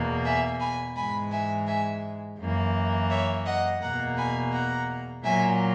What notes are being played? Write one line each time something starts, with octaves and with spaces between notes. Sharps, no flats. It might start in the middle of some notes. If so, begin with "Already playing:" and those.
Already playing: E2 B2 A#3
E5 G#5
G#5 B5
G#2 E3 G#3 G#5 B5
E5 G#5
E5 G#5
F#2 E3 A#3
C#5 E5
D#5 F#5
E2 B2 A#3 F#5 A#5
G#5 B5
F#5 A#5
A#2 F#3 A#3 E5 G#5